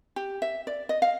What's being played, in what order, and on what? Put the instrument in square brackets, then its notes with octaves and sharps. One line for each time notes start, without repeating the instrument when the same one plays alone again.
[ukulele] G4
E5
D5
D#5
F5